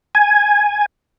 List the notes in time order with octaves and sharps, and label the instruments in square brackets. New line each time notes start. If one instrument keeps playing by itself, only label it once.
[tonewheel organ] G#5